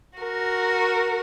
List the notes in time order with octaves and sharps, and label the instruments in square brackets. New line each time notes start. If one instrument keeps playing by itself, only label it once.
[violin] F#4 A#4